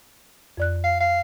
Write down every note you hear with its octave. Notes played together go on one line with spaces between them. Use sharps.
F2 D5 F#6
F5
F5